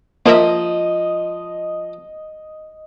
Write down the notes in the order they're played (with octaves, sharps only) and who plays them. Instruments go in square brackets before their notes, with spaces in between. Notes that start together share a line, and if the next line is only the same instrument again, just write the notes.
[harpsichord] F3 [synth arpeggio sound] A#3 A#4 E5 [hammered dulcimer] D#5